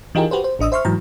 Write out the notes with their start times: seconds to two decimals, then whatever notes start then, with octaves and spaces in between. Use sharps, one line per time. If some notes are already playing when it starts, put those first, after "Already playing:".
0.15 E3 D#4 F4 G4 G#4 A#4
0.31 F#4 G4 B4 C5
0.44 C5
0.59 A1 D4 D#5 D#6 E6
0.72 C5 E5 C6 C#6 F6
0.85 G#2 E3 F#3 A#5